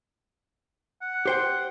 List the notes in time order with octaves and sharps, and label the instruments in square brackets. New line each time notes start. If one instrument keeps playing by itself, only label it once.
[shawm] F#5
[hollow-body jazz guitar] G4 C5 G5